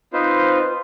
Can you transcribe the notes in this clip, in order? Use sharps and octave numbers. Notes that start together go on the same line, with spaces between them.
C4 D#4 F4 B4 C5